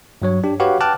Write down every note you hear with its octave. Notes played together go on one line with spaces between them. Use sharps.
G2 F#3 C#5
D4 G4
F#4 G4 B4 C#5 F5 F#5
G5 A5 D6 F6 F#6 A6